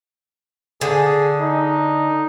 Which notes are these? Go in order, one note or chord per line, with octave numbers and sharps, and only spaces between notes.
D3 G#4
D#4